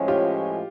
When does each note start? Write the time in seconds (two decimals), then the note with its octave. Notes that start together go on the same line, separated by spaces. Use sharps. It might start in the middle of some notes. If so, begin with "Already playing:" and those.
Already playing: A2 F3 G#3 C#4
0.08 F4 G4